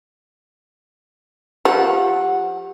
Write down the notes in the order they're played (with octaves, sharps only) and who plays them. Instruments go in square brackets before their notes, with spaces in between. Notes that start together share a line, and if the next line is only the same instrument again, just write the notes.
[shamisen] F3 [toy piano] G4 [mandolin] F#5